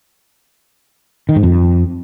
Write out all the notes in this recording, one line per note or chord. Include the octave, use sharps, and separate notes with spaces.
D#3
G#2
F2